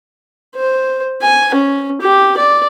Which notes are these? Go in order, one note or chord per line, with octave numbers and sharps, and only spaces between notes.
C5
G#5
C#4
G4
D5